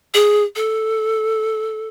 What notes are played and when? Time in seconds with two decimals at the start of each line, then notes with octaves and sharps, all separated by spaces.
0.14 G#4
0.56 A4